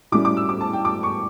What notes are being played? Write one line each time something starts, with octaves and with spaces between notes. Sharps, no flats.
A2 G3 C#4 E4 D6
D6
E6
D6
A5
G5
D6
C#6